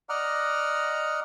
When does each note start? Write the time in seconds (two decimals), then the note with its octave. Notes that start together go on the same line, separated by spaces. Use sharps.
0.09 D5 D#5 F#5 A#5 F6